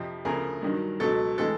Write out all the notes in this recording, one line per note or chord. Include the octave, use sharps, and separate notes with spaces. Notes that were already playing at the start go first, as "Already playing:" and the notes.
Already playing: F2 C3 F3
D2 C#3 F3 A3 G#4 A#4
G2 D#3 F#3
C#2 B2 F#3 A4
A2 E3 G#3 A4